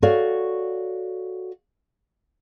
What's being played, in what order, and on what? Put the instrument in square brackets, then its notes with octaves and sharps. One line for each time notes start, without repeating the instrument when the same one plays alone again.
[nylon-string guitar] F#4 A4 C#5 D5 F5